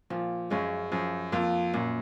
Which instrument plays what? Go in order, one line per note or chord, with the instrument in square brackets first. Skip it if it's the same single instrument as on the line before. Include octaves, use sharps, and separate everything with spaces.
[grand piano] A#2 [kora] F3
[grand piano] F#2 [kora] G#3 C#4 F4
[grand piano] F#2 [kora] F3
[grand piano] F2 [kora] A#3 F4 C5
[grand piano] F#2 [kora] A#2